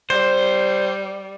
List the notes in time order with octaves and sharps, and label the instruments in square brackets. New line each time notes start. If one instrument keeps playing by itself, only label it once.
[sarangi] G3 [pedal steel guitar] C5